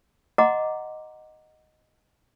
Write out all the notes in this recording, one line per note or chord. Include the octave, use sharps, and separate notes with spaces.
D#5 F#5 A#5 C6 D6